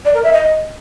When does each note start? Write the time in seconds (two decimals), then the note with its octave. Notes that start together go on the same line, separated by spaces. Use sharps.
0.05 D5
0.14 A#4
0.24 E5
0.33 D#5